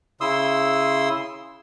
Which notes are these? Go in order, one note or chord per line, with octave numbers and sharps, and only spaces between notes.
C#3 E4 C6 D#6 E6